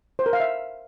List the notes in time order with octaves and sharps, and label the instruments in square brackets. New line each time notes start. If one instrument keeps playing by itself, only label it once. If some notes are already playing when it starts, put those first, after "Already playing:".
[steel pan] C5
A#4
F5
E5